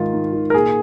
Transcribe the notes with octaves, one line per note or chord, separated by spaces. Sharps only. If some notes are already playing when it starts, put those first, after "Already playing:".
Already playing: G#2 D#3 F4
G#2
D#3
A#4
A#2 G#4